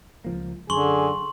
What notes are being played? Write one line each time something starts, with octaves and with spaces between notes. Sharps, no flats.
C#2 F3 A#3
F#2 D3 G#4 C6 C#6 F#7